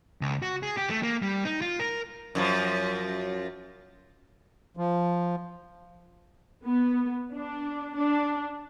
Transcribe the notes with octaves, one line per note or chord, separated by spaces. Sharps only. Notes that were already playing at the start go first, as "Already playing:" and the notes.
C#2
F#4
G#4
G4
A3
A#3
G3
D#4
F4
A#4
F#2 D#3 F3
F3
B3
D4
D4